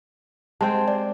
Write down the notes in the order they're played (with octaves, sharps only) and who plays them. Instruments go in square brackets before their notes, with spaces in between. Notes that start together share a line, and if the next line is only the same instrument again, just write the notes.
[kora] G#3 C4 G5 [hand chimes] A5
[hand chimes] D5